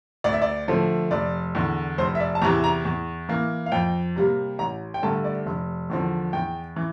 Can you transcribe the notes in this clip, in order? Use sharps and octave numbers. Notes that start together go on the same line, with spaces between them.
D2 D5
E5
D5
D3 F3 A3
F1 D5
E2 D3
F1 C5
E5
D5
A5
E2 C3 E3 A#5
A#5
E2
E3 A#3
F5
F2 G5
C3 G3 A#3
A1 A#5
G5
G2 D3 A3 A5
D5
F1
E2 D3 F3
E2 G5
E3